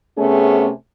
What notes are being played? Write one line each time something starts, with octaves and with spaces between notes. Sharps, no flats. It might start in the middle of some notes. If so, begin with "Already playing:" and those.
C3 A3 B3 C#4 G#4